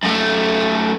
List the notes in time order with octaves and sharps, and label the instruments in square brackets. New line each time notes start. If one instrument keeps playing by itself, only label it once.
[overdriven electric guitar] F#2 A3